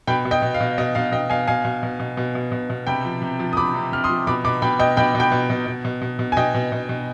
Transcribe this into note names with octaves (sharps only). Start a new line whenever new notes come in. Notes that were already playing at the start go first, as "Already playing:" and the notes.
B2 G5 B5
B2
D#5 G5
B2
F5
B2
B2 D#5
B2 F5
B2 D#5 G5
B2 F5 G#5
B2 F5 G#5
B2
B2
B2
B2
B2
B2
B2
C3 G5 B5
F3
C3
F3
D#6
C3 B5 D6
C3
C3 F6
C6 D#6
F3
B2 B5 D6
B2 B5 D6
B2 G5 B5
B2 D#5 G5
B2 G5 B5
B2
G5 B5
B2
B2
B2
B2
B2
B2
G#5
B2 D#5 G5
B2
B2
B2